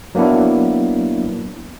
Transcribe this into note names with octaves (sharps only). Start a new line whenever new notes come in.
F#3 A#3 B3 D4 E4